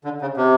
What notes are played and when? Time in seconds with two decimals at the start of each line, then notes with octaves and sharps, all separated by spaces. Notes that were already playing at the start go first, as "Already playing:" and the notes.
0.04 D3
0.21 C#3
0.37 C3